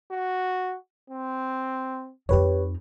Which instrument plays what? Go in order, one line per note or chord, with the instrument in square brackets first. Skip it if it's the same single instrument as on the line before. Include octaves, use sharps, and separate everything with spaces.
[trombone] F#4
C4
[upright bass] F2 D#4 [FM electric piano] G4 B4 C#5